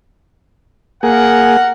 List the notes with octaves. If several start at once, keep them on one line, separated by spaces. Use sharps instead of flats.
A#3 G#4 A#4 F#5